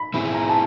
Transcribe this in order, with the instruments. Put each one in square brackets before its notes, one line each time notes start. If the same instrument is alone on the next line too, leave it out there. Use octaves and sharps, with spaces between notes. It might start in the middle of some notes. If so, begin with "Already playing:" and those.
Already playing: [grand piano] B5
[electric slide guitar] C4 E4 G#4 [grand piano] B5
[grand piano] A#5
A5